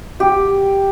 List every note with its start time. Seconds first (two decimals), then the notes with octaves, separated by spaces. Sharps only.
0.20 G4